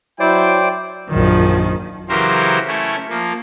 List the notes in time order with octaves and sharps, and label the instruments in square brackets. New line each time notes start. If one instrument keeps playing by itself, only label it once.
[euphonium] F#3 [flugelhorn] E4 [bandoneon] C5 D5 [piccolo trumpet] G5
[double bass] A#1 F#2 [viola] D#3 F3
[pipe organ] C#3 E3 F#3 G4 A#4 C5
A3 C#4 E4
F3 A#3